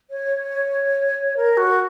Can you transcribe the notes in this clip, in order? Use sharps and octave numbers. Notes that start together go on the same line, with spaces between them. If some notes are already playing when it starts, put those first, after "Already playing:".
C#5
A#4
F#4